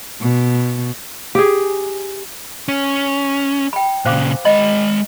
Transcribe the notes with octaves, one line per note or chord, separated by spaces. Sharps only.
B2
G4 G#4
C#4
G5 B5
A#2 C#3 C5 F5 D6
G#3 D#5 B5